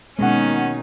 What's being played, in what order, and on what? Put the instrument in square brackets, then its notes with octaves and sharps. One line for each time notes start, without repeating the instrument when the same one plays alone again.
[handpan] B2 A#3 [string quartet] D#3 D#4 [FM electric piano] G#3 F#5 [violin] C#4